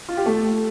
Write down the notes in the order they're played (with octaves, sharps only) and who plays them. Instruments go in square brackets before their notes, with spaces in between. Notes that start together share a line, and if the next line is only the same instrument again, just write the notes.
[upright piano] F4
G4
A3 A4